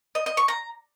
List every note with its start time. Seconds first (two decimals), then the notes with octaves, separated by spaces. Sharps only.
0.15 D#5
0.26 D#5
0.37 C#6
0.48 A#5